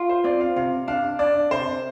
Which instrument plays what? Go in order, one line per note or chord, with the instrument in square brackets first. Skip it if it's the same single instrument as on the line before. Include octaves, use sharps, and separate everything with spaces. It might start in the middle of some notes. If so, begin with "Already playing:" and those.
Already playing: [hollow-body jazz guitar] F4
[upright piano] C5
[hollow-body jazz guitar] C4 [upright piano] D5
[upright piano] F5
[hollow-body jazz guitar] C3 [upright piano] F5
[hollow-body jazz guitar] D4 [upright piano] F5
[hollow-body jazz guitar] D4 [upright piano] D5
[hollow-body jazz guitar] C3 [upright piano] C5